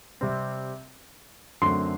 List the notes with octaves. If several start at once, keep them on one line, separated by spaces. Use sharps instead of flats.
C3 G3 C4
F#2 D3 F#3 A3 C4 C6